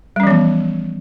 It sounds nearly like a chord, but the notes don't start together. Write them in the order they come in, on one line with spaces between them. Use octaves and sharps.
G3 C#4 F3 E3 B3